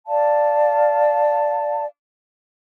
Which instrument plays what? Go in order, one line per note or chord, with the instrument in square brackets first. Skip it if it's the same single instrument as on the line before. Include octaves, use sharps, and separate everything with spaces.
[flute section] D5 F5 A5